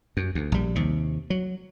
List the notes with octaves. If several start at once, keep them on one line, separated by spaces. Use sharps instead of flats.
F#2
D2
A#1 G3
D#2 C3
F#3